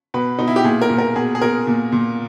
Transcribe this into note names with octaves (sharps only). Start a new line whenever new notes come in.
B2 B4
B2 D#4
E4
G4
A#2 G#4
A#4
A#2
A#4
B2 G#4
G#4
B2 A#4
A#2
A#2